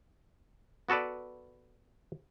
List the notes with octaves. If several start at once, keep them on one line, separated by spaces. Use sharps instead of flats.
B3 F#4 A4 B4 D5